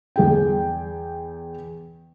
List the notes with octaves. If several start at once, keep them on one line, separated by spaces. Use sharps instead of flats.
E2 G#4 G5